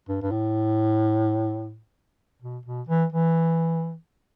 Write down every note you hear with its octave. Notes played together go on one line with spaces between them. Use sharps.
G2
G2
A2
B2
B2
E3
E3